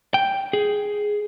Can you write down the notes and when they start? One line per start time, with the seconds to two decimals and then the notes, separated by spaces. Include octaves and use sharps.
0.14 G5
0.53 G#4